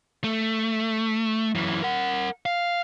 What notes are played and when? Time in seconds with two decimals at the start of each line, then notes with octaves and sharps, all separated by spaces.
0.24 A3
1.55 F#2 E3
1.83 A#4 F#5
2.46 F5